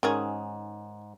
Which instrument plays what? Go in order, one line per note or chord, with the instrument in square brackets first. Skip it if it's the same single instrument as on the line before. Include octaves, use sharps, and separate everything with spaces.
[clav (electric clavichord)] G#2 [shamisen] D#3 C#4 G#4